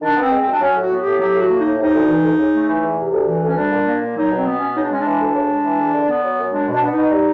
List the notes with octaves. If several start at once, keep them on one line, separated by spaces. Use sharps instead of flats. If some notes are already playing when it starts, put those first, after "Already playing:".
D#3 D4
B3
C4
G#3
C4
F#2
D4
F#3 C#4
A2 F#4
B3
G4
A2
F#3 G4
A2
F#4
A#3
A2 D#4
C3 D#4
D2
E3
D2
C#3
A3
E3
E2
C3
D2
E3
D2 C#4
G3 D4
A#2
A#3
A#2
F#3 D#4
B2 C4
B3
B2 C#4
C#3 D#4
D4
G#3 C#4
D4
E3
D2
C#3
G#3
E3
E2
D3
B3
F#3
F#2
G#3 D4
B2 D4
B3
D#4
B2
G3